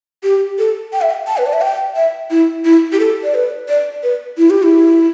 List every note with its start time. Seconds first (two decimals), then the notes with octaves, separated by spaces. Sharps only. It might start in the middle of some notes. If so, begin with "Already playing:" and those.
0.23 G4
0.59 A4
0.93 G5
1.01 E5
1.11 G5
1.27 A5
1.37 B4
1.46 D5
1.53 E5
1.61 G5
1.96 E5
2.31 E4
2.65 E4
2.92 G4
3.00 A4
3.24 D5
3.35 B4
3.68 D5
4.03 B4
4.38 E4
4.50 G4
4.63 E4